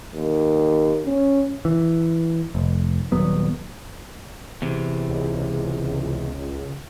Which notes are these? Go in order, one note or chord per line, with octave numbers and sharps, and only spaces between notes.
D#2
C#4
E3
F1
D#1 F#3 B3
E2 C3
C#2